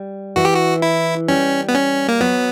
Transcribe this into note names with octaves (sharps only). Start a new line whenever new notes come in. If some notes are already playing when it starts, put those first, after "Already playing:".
Already playing: G3
E3 F#4
G4
F#4
E4
G3 C#4
B3
C#4
A#3
F#3 B3